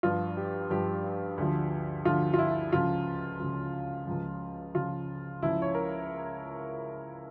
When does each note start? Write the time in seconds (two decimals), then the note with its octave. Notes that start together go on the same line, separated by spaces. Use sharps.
0.03 G2 F3 F4
0.37 G4
0.71 G2 F3 G4
1.38 D2 D3 F3
2.05 D2 D3 F3 F4
2.34 F4
2.38 E4
2.72 C#2 C#3 F3 F4
3.40 C#2 C#3 F3
4.07 C#2 C#3 F3
4.75 C#2 C#3 F3 F4
5.42 C#2 C#3 F3 E4
5.62 C#5
5.75 A#4